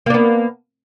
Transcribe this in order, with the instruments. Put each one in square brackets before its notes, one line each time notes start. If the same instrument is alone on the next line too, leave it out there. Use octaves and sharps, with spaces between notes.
[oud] A#3
D4
B3